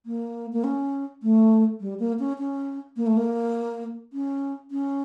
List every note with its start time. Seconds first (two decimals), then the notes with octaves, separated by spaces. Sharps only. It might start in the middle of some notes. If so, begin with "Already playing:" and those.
0.06 A#3
0.53 A#3
0.64 C#4
1.23 A3
1.81 G3
1.99 A#3
2.19 C#4
2.38 C#4
2.97 A#3
3.07 A3
3.17 A#3
4.13 C#4
4.71 C#4